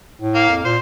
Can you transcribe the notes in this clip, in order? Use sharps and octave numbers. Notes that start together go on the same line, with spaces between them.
A2
A#3 F5
F2
A#2 C5